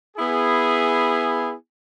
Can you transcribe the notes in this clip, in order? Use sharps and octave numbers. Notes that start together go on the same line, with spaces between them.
B3 E4 G#4